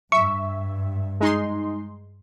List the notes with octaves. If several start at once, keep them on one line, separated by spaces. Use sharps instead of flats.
G2 E5 C#6
G#3 D#4 C6